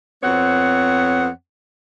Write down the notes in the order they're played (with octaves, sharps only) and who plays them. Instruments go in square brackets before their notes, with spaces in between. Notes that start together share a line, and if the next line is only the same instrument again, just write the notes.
[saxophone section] F2 B3 C4 C#5 F#5